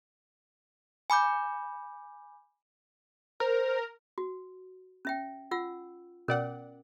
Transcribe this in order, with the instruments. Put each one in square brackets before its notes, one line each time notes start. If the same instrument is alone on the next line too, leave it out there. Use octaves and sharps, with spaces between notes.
[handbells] G#5 B5 D6 G6
[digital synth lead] A#4 [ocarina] C5
[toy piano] F#4
C#4 E5 G5
F4 F#5 E6
[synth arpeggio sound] B2 D5 F#5 [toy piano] C#4 A#4